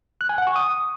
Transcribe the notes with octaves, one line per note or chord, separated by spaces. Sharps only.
F#6
G#5
F#5
C#6
D#6